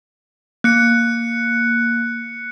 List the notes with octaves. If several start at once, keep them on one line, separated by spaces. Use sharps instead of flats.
A#3 F#6 C#7